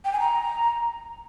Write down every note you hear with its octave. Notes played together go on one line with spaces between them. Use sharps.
G5
G#5
A#5